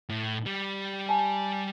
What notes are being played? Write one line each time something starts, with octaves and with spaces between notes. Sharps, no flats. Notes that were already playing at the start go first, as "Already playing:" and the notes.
A2
G3
G#5 A5